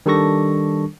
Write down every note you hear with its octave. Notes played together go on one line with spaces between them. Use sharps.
D#3 G3 D4 A4 C#6 A#6